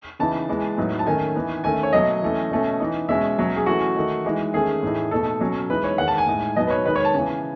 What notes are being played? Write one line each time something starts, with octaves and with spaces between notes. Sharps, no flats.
C#3 E3 B3 D#4 A5
E3 G#3 B3
A2 F#3 B3 D#4
A5
D#3 A3 C#4 G#5
E3 B3 D#4
D#3 A3 C#4 G#5
C#5
B2 F#3 A3 D#5
E3 A3 C#4
B2 A3 C#4
E3 B3 D#4
B2 G#3 C#4 E5
B2 F#3 C#4
G#4
E3 A3 C#4 F#4
D#3 A3 D#4
E3 G#3 D#4
D#3 A3 C#4 G#4
A2 E3 A3 D#4
B2 A3 D#4 A4
B2 F#3 C#4
E3 G#3 B3 D#4 B4
C#5
D#3 G#3 B3 F#5
A5
G#5
A2 G#3 D#4
B2 F#3 B3 D#4 D#5
B4
C#5
D#3 G#3 D#4 B4
C#5
A5
C#3 E3 B3 G#5